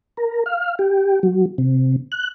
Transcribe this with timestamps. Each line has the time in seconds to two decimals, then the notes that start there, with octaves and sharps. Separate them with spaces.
0.17 A#4
0.46 F5
0.79 G4
1.23 F#3
1.58 C3
2.12 F#6